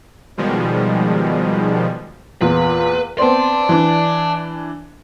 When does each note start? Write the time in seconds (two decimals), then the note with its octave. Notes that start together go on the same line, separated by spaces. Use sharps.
0.37 B2 D#3 F3 G3 G#3
2.41 E2 A#2 B4
3.18 B3 C4 C5 D5 A5
3.69 E3 D4